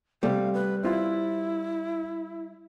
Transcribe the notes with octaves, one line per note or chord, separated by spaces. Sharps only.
C3 G3 A3 F5
B4
C4 E4 F4